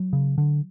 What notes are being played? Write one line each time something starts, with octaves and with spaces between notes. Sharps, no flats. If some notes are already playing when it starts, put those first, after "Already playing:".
Already playing: F#3
C#3
D3